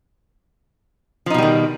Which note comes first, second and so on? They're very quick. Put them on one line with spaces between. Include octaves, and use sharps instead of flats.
F3 D#4 B2 G3 D#3